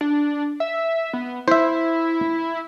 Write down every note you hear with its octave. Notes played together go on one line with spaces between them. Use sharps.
D4
E5
B3
E4 C5 E5